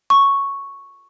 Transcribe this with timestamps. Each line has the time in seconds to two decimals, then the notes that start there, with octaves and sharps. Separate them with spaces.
0.10 C#6